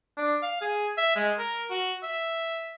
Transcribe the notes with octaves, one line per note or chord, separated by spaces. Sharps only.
D4
F5
G#4
E5
G#3
A#4
F#4
E5